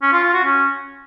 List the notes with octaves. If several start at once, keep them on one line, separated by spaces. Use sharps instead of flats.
C#4
F4
F4
F#4
C#4